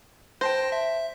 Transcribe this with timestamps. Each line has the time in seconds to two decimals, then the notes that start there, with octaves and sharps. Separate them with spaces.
0.41 C5 G5 A5 A#6
0.72 E5